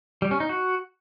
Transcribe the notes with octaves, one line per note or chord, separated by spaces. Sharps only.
G3
C#4
D#4
F#4